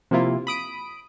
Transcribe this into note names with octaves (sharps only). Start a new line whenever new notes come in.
C3 F3 A#3 E4 F4
B5 D#6 D7